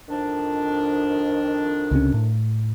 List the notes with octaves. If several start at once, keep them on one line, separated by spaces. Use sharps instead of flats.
F2 D#3 D4
C#2 C3 C#4
A2